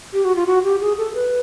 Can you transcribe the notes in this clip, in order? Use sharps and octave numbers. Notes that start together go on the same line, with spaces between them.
G4
F#4
F4
F#4
G4
G#4
A4
B4